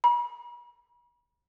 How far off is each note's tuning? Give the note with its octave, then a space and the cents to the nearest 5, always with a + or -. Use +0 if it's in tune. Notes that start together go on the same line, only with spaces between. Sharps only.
B5 -40